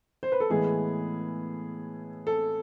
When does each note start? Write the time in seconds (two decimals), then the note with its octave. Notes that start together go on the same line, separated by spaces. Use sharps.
0.23 C5
0.32 B4
0.40 A4
0.50 A2 E3 G#3 B3 G#4
2.27 A4